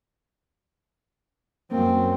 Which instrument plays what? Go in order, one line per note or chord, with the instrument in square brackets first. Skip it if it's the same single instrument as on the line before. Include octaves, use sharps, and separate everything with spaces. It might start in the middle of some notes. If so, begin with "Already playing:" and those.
[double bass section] F#2 [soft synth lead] A#3 [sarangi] C4